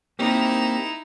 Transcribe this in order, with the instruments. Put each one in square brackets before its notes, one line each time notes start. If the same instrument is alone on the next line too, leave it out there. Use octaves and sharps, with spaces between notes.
[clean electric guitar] A#3 C4 G4 [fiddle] D#4 E4